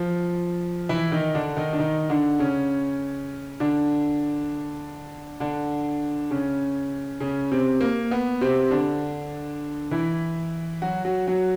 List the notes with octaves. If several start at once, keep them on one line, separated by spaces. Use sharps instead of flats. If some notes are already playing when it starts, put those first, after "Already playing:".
Already playing: F3 F4
E3 E4
D#3 D#4
D3 D4
D#3 D#4
D4
D#3 D#4
D3 D4
C#3 C#4
D3 D4
D3 D4
C#3 C#4
C#3 C#4
C3 C4
A#3
B3
C3 C4
D3 D4
E3 E4
F#3 F#4
F#3 F#4
F#3 F#4